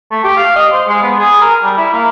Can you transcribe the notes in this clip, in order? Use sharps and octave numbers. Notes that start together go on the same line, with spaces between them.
A3
G4
F5
D#5
C5
G#3
B3
G#4
A#4
G3
E4
A#3